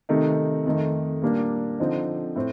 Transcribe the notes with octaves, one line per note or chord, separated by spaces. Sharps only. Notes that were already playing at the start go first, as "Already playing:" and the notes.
C3 D#3 A3 D#4
F2 D#3 A3 D#4
A#2 G3 A#3 D4
D3 F3 C4 D#4
A2 A3 C4